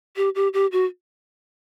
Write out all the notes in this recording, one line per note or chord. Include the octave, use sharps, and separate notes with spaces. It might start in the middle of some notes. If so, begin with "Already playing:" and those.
G4
G4
G4
F#4